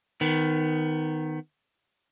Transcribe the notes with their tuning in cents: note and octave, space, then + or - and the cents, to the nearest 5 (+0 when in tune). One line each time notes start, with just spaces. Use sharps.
D#3 +0 B3 +20